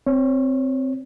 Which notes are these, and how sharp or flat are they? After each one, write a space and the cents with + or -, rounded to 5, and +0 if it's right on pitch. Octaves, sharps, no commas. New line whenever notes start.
C4 +0 C#5 +10